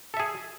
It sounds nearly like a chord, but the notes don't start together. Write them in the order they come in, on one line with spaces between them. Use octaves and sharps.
A4 E5 G#4